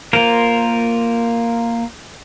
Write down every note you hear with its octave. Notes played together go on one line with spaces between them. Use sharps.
A#3 F4 A#4 C5